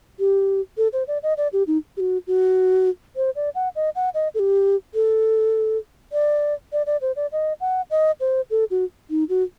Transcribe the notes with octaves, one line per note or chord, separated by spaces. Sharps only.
G4
A4
C5
D5
D#5
D5
G4
D#4
G4
F#4
F#4
C5
D5
F#5
D#5
F#5
D#5
A4
G4
A4
D5
D5
D5
C5
D5
D#5
F#5
D#5
C5
A4
F#4
D#4
F#4